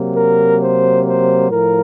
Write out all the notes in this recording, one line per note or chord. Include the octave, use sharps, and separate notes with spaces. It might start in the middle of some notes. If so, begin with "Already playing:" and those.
Already playing: C3 F#3 A#3
A#4
C5
C5
A2 F3 A#4